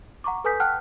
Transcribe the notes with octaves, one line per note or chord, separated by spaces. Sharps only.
F#5 A#5 C#6 D6
A4 B4 G#5 D#6 G6 B6
F#5 G5 A5 F6 F#6